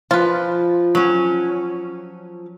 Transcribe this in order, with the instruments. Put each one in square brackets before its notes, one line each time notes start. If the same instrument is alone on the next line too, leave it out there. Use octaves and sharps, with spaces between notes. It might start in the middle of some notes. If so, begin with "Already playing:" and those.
[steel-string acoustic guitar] F3 [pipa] F4 B4
[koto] F#3 C#4